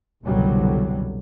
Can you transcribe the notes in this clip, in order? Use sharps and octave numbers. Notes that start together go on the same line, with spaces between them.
F#1 C2 B2 D3 F#3 G3